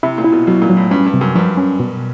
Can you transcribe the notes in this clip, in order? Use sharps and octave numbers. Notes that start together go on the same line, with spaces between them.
C3 E4
A#2
E4
B2
B2 F#3
A#2
F#3
A2
G2 C#4
G2
C3
F#2
G2 F3
C#4
B2